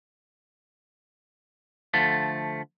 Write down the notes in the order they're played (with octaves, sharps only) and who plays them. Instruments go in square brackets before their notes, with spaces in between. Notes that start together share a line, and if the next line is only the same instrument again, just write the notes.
[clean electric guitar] D3 F3 A3